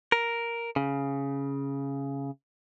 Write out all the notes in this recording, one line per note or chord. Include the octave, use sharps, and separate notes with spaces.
A#4
C#3